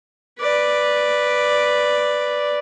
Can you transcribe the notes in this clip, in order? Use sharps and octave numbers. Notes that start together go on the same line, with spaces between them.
B4 D5